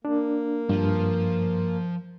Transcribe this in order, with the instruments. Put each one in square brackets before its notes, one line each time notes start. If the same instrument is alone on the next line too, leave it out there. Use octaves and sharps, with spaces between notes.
[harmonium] A#3 [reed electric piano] D4
[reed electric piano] G2 [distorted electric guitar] F3